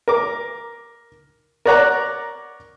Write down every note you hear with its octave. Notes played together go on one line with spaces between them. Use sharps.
A#4 D6
A#4 C#5 D5 F#5 A#5